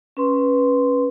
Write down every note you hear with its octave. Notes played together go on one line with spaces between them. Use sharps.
C#4 B4 C6